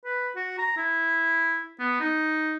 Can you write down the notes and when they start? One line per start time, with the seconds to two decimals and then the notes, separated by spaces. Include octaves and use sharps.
0.05 B4
0.36 F#4
0.58 A#5
0.77 E4
1.80 B3
2.00 D#4